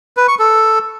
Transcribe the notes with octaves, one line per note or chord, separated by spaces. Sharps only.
B4
C#6
A4